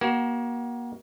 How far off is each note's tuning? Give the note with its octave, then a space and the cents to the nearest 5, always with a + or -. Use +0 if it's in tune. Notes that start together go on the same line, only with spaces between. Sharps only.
A#3 +30 F#4 +35